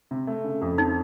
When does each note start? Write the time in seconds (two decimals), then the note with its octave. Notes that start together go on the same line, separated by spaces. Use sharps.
0.11 C3
0.27 A3
0.44 C#3
0.61 F2
0.78 C4 D#4